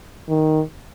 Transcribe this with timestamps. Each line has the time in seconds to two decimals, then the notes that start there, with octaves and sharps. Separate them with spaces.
0.28 D#3